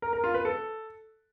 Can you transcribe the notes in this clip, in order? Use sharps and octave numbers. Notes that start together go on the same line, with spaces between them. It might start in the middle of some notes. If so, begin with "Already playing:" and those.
A#4
A#4
F4
B4
A4